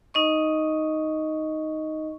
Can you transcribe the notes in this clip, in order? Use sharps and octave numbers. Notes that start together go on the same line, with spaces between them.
D#4 D#5 C#6